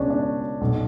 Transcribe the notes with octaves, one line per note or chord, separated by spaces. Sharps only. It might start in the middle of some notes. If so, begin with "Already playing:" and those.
Already playing: C#2 B2 C#4 D4
D4
B1 B2